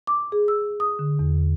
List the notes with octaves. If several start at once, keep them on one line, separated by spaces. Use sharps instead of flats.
D6
G#4
E6
D#6
D3
E2